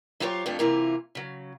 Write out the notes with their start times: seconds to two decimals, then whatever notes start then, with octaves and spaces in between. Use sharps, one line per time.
0.20 F#3 E4 F4 G4 C5 C#5
0.46 F2 A#2 G3 A3 D4 F4
0.59 C3 E3 A#3 E4 F4 A#4
1.15 C#3 F#3